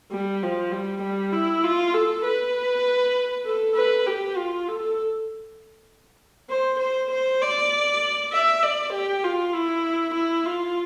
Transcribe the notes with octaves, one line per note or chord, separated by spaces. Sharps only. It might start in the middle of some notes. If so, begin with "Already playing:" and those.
G3
F3
G3
G3
E4
F4
A4
B4
A4
B4
G4
F4
A4
C5
C5
C5
D5
E5
D5
G4
F4
E4
E4
F4